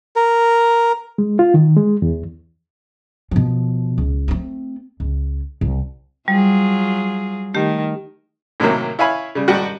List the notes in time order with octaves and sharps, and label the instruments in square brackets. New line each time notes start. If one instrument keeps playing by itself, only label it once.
[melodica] A#4
[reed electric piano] G#3
F4
D#3
G#3
E2
[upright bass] B2 F3
C#2
A3 C4
C#2
C2
[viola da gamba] F#3 F4 G#4 [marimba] G3
[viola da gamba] D#3 [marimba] A3 G4
[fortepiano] A2 C3 D#3 F#3 A#3
E4 C#5 F5 G#5 B5
C#3 G3
G#1 G3 F#4 G5